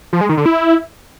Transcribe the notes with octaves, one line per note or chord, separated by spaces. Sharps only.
F3
G#3
D#3
D3
E4